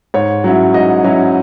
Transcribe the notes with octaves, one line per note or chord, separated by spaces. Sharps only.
G#2 C#5
F#3 C#4 E4
G#2 D#5
F#3 C#4 E4